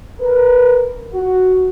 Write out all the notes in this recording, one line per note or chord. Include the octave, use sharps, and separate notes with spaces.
A#4 B4
F#4